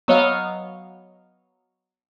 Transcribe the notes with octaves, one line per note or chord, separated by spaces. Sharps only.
F#3 B3 C#5 D#5 F5 F6